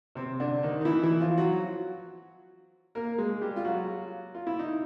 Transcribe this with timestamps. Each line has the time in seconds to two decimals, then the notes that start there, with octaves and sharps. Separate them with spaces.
0.15 C3 C4
0.40 D3 D4
0.63 D#3 D#4
0.81 D#4
0.85 E3 E4
1.03 E3 E4
1.20 F3 F4
1.38 F#3 F#4
2.95 A#3 A#4
3.18 G#3 G#4
3.41 G3 G4
3.56 F4
3.65 F#3 F#4
4.35 F4
4.47 E4
4.59 D#4